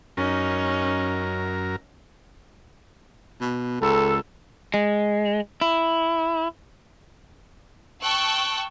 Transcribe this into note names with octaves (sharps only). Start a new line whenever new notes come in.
F#2 C#4 D#4 A#4
B2
C#2 A4
G#3
E4
G5 A5 C#6 E6 F#6